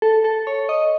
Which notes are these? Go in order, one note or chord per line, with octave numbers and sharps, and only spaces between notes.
A4
A4
C#5
D#5